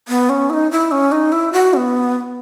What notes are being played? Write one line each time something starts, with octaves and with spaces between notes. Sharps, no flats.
B3
C#4
E4
D#4
E4
C#4
D#4
E4
F#4
C#4
B3